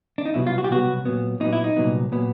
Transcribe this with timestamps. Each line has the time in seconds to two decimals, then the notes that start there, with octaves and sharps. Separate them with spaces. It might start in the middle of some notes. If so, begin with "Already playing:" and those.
0.18 D4
0.25 D#4
0.34 C2 B2 F#3 B3 E4
0.47 F4
0.58 F#4
0.64 G4
0.69 C2 B2 F#3 B3 F#4
1.05 A#2 F#3 B3
1.40 A#2 F#3 B3 D#4
1.53 E4
1.64 D#4
1.76 C2 A#2 F#3 B3
2.12 A#2 F#3 B3